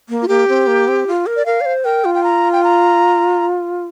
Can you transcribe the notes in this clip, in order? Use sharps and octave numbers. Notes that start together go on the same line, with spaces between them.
A#3
F4
A#3 G4
C4
A#3
C4
F4
A#4
D5
A#4 F5
D5
C5
A#4 G5
F4
G5
A#5
G5
A#5